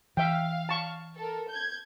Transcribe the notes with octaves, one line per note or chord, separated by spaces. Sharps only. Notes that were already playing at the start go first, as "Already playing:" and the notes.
E3 E5 F5 G5
A5 C#6
A4 A#4
G6 G#6